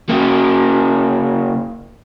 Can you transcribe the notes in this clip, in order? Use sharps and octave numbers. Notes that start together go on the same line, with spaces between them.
C#3 A#3